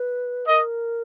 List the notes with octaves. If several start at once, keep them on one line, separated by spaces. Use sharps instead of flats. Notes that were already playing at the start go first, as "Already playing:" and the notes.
Already playing: B4
A#4 D#5